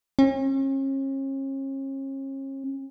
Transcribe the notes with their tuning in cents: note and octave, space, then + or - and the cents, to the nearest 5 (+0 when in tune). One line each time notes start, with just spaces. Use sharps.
C#4 -40